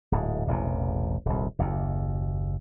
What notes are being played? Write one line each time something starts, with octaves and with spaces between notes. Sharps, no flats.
D1 G#2
E1 A1 C3
D#1 C2
F#1 D#2